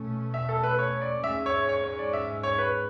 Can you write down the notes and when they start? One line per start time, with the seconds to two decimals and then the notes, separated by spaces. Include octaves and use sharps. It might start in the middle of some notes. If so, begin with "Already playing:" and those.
Already playing: B2 A3 C#4
0.34 E5
0.49 A4
0.63 B4
0.79 C#5
1.01 D5
1.23 G#2 G#3 C#4 E5
1.46 C#5
1.69 C#5
1.84 C#5
1.99 D5
2.13 E5
2.43 C#5
2.58 B4